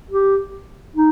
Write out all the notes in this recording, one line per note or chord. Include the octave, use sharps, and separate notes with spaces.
G4
D#4